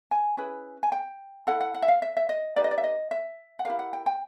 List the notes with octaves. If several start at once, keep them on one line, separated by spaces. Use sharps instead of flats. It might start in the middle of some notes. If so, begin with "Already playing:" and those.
G#5
C#4 E4 G#4 B4
G#5
G5
E4 A4 F#5
F#5
F#5
E5
F5
E5
E5
D#5
D#4 G4 B4 D5
D#5
D5
E5
D#5
E5
F#5
E4 G4 A#4 F5
F#5
G5
G5